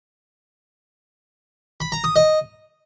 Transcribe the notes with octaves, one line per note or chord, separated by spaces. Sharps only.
B5
A#5
D#6
D#5